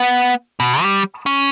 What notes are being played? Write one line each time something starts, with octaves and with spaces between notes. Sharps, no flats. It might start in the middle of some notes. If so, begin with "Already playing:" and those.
Already playing: B3
B2
G3
C#4